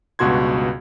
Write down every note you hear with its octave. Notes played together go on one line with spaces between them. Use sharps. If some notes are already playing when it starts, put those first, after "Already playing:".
C#2 G2 B2 F#4 C6 G#6